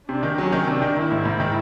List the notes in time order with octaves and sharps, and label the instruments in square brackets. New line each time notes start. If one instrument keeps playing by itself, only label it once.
[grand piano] C3 [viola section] D4
[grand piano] D#3
[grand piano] F#3 [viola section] C#4
[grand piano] D#3
[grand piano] C3 [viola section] D4
[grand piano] D#3
[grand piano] D#3 [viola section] E4
[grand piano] G#2
G#2
D#3